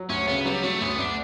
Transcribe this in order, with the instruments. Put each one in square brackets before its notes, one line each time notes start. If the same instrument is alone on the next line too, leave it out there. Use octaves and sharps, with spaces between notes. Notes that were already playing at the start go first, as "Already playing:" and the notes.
Already playing: [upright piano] F#3
[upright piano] D2 [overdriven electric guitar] C#4
[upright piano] C#3 [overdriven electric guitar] B3
[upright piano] F#3 [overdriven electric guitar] G3
[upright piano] F#3 [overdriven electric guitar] A3
[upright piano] D2 [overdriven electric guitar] B3
[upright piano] D2 [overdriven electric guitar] D4